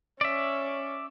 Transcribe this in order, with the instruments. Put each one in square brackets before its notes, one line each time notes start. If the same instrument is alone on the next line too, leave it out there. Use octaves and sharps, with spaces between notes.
[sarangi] C#4 [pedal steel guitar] D5 E5